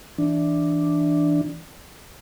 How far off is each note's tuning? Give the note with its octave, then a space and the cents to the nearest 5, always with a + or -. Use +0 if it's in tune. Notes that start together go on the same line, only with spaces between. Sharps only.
E3 +0 D4 +0